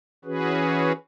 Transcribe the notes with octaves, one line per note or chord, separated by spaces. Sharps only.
E3 C#4 F#4 G#4 B4